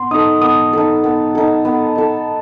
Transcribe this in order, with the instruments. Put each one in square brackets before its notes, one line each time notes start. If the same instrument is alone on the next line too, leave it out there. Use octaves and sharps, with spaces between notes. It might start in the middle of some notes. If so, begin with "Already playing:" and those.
Already playing: [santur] B3 [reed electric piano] C6
[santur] D#4 A4 [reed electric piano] D#6
[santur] B3 [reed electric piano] D#6
[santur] D#4 A4
B3
D#4 A4
B3
D#4 A4